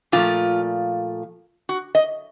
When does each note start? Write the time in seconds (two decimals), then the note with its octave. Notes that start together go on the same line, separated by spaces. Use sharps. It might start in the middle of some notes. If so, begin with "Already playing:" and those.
0.12 A#2 F3 A3 F4
1.69 F#4
1.95 D#5